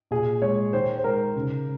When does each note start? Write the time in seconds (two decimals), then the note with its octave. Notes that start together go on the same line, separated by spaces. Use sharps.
0.11 A#2 G#4
0.42 G#3 C#5
0.73 D#3 C5
0.98 C5
1.04 G#3 A#4
1.36 C#3